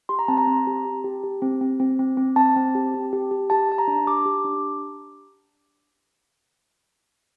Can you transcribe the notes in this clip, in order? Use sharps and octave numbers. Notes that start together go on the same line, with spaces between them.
G4 C6
A#5
C4 A5
A#5
C4
G4
G4
G4
G4
C4
C4
C4
C4
C4
C4 A5
C4
G4
G4
G4
G4
G4 A5
G4 A5
A#5
D4
G4 D6
G4
D4